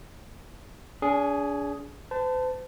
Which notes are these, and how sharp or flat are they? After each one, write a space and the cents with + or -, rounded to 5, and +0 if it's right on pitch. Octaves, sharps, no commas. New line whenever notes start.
D4 -40 G#4 +0
C5 -45 A5 +5